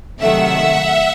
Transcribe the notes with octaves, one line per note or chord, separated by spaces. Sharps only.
C3 D#3 F#3 A3 E5 F#5